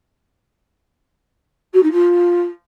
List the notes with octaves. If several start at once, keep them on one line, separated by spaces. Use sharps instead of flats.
F#4
D#4
F4